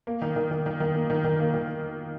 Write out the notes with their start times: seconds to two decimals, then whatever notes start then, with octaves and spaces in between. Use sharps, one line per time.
0.07 A#3
0.22 D#3
0.36 D#3
0.51 D#3
0.66 D#3
0.80 D#3
0.95 A#3
1.10 D#3
1.24 D#3
1.39 A#3
1.54 D#3